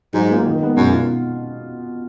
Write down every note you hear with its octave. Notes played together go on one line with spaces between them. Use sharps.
G#2 F#3
A#3 F4
D#3
G#3 B3
F#2 B2
F4